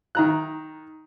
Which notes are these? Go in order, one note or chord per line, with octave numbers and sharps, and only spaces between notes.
D#3 A#5 F#6